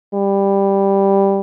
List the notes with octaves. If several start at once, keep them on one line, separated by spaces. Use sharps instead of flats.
G3